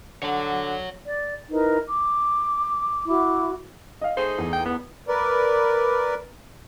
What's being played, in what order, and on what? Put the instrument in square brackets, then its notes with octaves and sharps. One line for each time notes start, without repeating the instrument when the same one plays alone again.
[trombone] D3 [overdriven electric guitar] C#5 F#5
[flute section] D5
D#4 E4 A#4 B4
D6
E4 F#4 D6
[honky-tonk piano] D#5 F5
[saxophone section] A3 D#4 G#4 [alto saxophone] C5 [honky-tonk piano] C7
[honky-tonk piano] E2
[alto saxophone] G5
B3
[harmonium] A#4 B4 D5